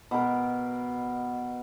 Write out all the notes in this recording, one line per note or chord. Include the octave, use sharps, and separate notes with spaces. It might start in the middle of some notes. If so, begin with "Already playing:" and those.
B2 A#4